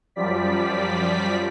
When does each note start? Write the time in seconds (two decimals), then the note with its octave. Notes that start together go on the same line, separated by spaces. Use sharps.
0.16 F#2 F3 G3 D5 B6